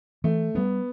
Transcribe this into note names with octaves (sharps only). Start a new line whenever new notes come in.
E3 A3
G3 B3 D4